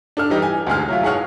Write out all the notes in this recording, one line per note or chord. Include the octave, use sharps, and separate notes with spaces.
D4 A4 F6
E3 G3 D#4 G4
G#5
D2 G#3 G#4 F6
F#3 E4 F4
B1 G#4 C#5 F#5 F6